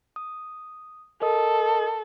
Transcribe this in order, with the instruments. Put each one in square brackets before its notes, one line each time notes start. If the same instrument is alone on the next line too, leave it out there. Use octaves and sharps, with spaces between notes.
[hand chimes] D#6
[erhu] A4 [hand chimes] A#4 D#5 D#6